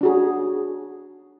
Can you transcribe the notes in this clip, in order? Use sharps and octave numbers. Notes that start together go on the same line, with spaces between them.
D4 F#4 G#4